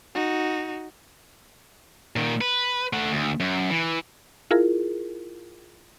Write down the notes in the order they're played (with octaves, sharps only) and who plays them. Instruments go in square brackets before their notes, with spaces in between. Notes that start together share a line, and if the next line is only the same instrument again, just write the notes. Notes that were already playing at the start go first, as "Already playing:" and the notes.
[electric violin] D#4 F#4
[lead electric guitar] A#2 D#3
B4
A3 F#5
D2
F#2
E3
[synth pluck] E4 F4 G#4 A#4